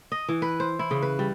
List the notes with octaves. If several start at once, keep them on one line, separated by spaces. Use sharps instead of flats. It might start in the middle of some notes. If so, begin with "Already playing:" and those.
D#5
E3
B4
C5
E4
C#3
B4
G3